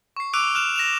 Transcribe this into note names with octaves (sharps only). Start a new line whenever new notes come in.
C#6 C7
D6 E6 F#6 D7 D#7 F7
F6 F#6 E7 F7
A#6 E7 F7